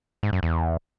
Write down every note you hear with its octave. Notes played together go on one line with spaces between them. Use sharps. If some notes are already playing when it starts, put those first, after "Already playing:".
G#2
F#2
E2